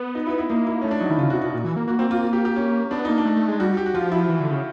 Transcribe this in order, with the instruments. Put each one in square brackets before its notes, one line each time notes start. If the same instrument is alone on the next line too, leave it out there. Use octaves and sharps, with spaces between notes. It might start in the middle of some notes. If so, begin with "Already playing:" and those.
Already playing: [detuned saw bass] B3
[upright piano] D#4
E4
E4
[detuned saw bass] A#3 [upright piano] D#4
[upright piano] E4
[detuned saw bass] A3 [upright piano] C#4
[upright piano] D4
[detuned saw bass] F#3 [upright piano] D#4
[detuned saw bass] D#3 [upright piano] E4
[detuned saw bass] C#3 [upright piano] F4
[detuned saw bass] C3 [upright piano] F#4
[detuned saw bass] B2 [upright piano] F#4
[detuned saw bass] A#2
E3
A#3
[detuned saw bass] A#3 [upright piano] F#4
[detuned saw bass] A#3 [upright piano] C4
[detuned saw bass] A#3 [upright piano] F4
[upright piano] G4
G4
C#4
[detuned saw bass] B3 [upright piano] D4
[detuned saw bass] A#3 [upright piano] D#4
[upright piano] D4
[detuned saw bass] A3
A3
G#3
[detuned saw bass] G3 [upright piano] F#4
[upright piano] G4
F#4
[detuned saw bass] F3 [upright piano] F4
[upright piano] E4
[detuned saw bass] E3
D3
C#3